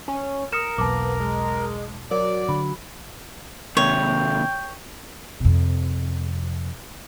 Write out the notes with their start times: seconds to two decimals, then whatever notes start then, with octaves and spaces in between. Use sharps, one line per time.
0.08 C#4
0.52 A#4 D#6 C#7 E7
0.78 E1 B1 A#3 B3 A5 D6
1.21 G#3
2.11 F#3 A#4 D5
2.49 D3 B5
3.77 D#2 C3 C#5 G5
5.40 F2 C3